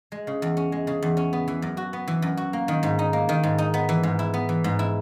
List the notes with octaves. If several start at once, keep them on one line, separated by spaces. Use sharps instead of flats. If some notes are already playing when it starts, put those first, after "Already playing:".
G#3
C#3
E2
C#4
G#3
C#3
E2
C#4
B3
E3
F#2
F#4
B3
E3
F#2
F#4
A#3
D#3
G#2
D#4
A#3
D#3
G#2
D#4
B3
E3
G#2
E4
B3
E3
G#2
E4